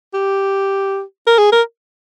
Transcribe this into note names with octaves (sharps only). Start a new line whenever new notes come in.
G4
A#4
G#4
A#4